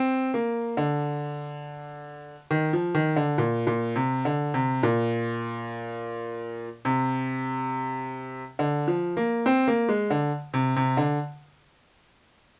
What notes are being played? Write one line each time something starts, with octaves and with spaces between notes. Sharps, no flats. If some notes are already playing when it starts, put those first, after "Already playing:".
Already playing: C4
A#3
D3
D#3
F3
D#3
D3
A#2
A#2
C3
D3
C3
A#2
C3
D3
F3
A#3
C4
A#3
G#3
D3
C3
C3
D3